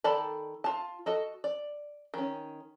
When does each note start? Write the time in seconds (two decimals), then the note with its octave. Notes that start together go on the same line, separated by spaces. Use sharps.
0.04 D#3 A4 D5 A5 B5
0.64 F4 A5
1.06 F#4 A4 D#5
1.44 D5
2.14 D#3 C#4